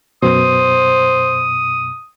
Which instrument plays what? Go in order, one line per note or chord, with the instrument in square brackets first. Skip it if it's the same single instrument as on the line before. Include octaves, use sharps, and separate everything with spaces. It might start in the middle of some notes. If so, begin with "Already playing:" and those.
[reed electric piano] F#2 B2 [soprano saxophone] C5 [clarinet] D#6